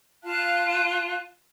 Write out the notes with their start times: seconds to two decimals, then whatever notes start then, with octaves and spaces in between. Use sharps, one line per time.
0.24 F4 F5 A5 F#6